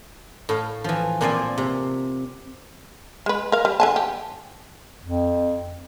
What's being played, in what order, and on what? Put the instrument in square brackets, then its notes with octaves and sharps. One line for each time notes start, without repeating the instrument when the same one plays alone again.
[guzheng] A2 F5
E3 F3
A#2 F3 C4 C5 D5 G#5
C3
[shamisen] G#3 B4
A#4 F5
G3
D3 G#5 A5
G4
[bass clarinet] F2